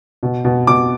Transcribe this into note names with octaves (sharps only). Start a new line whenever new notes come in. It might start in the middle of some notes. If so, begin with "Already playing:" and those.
B2
B2
B2 D6